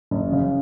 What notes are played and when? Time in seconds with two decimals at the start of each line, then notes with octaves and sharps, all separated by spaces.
0.11 F#1
0.32 C#3